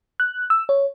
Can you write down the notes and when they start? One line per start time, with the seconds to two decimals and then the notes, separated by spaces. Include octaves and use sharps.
0.20 F#6
0.50 E6
0.69 C#5